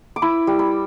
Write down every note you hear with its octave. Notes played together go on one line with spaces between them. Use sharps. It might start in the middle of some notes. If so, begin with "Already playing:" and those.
D6
E4 B5
G3
B5